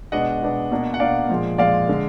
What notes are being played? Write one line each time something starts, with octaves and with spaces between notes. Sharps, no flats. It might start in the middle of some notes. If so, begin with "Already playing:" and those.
B2 G#3 B3 D4 D#5 F#5
B2 G#3 B3 D4
B2 A#3 D4
F#5
B2 A#3 D4 D5 F5
A#2 F3 G#3
A#2 F3 G#3 D5 F5
D3 G#3